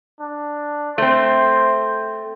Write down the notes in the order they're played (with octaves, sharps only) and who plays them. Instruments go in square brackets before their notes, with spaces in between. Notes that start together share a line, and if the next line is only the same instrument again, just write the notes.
[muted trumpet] D4
[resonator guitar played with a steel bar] A3 C4 [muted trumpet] C5